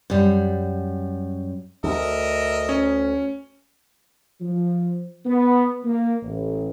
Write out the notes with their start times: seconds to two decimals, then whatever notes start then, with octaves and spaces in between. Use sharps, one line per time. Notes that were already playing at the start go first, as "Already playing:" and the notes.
0.10 F#2 G3
1.84 D2 A#4 D#5 E5
2.69 C#4
4.41 F3
5.25 B3
5.84 A#3
6.22 A1